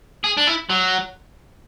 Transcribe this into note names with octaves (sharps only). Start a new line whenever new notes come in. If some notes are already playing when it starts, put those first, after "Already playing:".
G#4
D4
E4
F#3